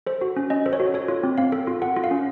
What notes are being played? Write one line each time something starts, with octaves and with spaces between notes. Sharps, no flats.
A4 C5
F#4
C#4
C#4 D#5
A4 C5
C#5
F#4
A4 C#5
F4
C4
C4 F5
A4
F4
A4 F#5
F4
F5
C#4